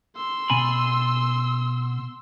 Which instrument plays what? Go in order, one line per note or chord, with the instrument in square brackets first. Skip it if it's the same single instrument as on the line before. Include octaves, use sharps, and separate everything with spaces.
[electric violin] C6 E6
[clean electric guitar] B2 G#5 B5